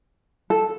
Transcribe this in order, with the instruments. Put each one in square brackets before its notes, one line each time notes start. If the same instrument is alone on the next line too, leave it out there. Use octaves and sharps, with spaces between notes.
[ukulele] A4